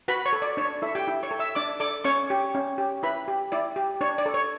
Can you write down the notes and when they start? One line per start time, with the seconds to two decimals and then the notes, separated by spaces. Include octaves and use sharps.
0.08 F#4 B4 B5
0.25 C#5 C#6
0.33 A4
0.42 D5
0.57 D4 C#5
0.82 E4 A4 E5
0.95 G4 G5
1.07 E4
1.23 C#5 C#6
1.31 A4
1.39 E5 E6
1.55 D4 D5 D6
1.80 A4 D5 D6
2.04 C#4 C#5 C#6
2.30 G4
2.55 C#4
2.78 G4
3.03 E4 B4 B5
3.28 G4
3.52 E4 D5
3.76 G4
4.01 D4 C#5
4.18 D5
4.26 A4
4.34 C#5